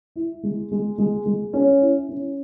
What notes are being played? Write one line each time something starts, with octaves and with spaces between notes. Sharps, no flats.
E4
G#3
G#3
G#3
G#3
C#4
E4
C#4